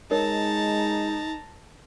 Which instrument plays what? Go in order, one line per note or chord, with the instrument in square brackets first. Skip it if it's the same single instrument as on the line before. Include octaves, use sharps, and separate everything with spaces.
[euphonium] G#3 [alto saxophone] D#4 [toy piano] A#4 C#5 [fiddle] A5 A#5